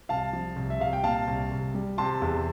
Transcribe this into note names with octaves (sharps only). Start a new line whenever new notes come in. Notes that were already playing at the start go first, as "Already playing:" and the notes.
C2 F5 A5
F3
C2
E5
C2 F5
G5
A#2 F5 A5
C2
C2
G3
C3 A5 C6
E2